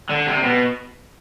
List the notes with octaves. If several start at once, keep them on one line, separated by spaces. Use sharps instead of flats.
D3
C3
B2